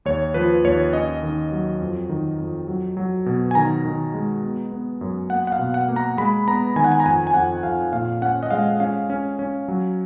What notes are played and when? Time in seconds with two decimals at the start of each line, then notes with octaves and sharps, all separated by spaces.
0.05 D#2 C#5
0.34 F3 B4
0.64 D#2 C#5
0.93 C#4 D#5
1.23 D#3
1.52 F#3
1.81 F2
2.09 D#3
2.40 F2
2.68 F#3
2.97 F#3
3.26 B2
3.51 G#5
3.55 D#3 A#5
3.85 D#3
4.14 G#3
4.42 B3
4.72 B3
5.01 F#2
5.30 A#3 F#5
5.47 F#5
5.52 F5
5.59 B2
5.74 F#5
5.88 A#3
5.96 A#5
6.17 G#3 B5
6.47 B3 A#5
6.76 D#3 G#5
6.84 F#5
6.92 G#5
7.00 A#5
7.05 F2 G#5
7.27 G#5
7.34 F2 F#5
7.63 F2 F5
7.92 A#2 F5
8.22 C#4 F#5
8.43 D#5
8.51 G#3 F5
8.80 C#4 F5
9.10 C#4
9.39 C#4
9.68 F#3